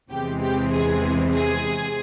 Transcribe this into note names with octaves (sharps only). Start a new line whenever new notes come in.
E2 C3 E3 G#3 C4 G4
G4
G#4
G#4